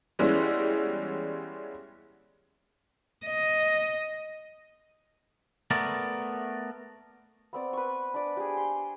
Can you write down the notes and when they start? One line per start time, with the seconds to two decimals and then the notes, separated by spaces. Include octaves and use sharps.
0.19 E3 G3 G#3 B3 C#4 E4
3.26 D#5
5.71 A3 B3 A#4 D5
7.53 B3 C4 D5
7.73 B4 C#6
8.14 D4 D5 B5
8.37 G4 G#4
8.57 C6